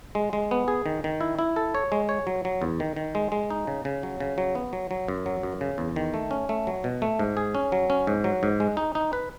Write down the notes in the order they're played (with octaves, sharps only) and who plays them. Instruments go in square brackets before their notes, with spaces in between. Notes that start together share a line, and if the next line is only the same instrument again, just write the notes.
[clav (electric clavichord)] G#3
G#3
B3
G#4
D#3
D#3
E4
E4
A4
C#5
G#3
C#5
F#3
F#3
E2
D#3
D#3
G#3
G#3
D#4
C#3
C#3
F#3
C#3
F#3
B3
F#3
F#3
F#2
F#3
F#2
C#3
E2
D#3
A3
C#4
A3
F#3
B2
A3
G#2
G#4
C#4
F#3
C#4
G#2
F#3
G#2
G#3
D#4
D#4
B4